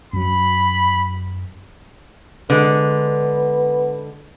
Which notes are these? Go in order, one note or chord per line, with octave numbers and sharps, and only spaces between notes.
F#2 F#3 B5
D3 G#3 B3